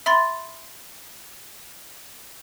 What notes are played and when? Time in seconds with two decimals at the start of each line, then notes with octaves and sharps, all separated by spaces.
0.06 E5 B5 C6 A6